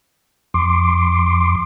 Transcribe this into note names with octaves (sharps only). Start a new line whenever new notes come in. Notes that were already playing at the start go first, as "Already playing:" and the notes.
F2 C6 D6